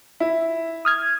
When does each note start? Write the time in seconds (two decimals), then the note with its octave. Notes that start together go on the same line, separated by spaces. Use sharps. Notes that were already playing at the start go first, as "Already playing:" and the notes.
0.20 E4
0.85 D#6 F6 G#6